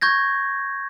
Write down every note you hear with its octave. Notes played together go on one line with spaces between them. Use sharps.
C#6 G6 G#6 A#6